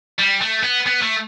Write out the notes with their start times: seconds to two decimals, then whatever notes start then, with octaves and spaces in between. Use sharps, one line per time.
0.19 G3
0.41 A3
0.63 B3
0.87 B3
1.02 A3